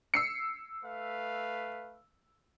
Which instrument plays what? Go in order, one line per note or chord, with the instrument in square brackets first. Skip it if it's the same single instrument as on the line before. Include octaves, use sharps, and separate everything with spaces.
[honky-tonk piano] E6 C7 C#7
[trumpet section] A3 B4 F5